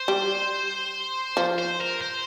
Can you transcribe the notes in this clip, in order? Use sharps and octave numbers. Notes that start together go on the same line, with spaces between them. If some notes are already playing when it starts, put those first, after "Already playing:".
Already playing: C5
G3
F3
C5
A#4
C5